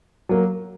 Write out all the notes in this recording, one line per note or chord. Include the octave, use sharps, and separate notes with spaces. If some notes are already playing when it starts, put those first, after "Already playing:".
F#3 A#3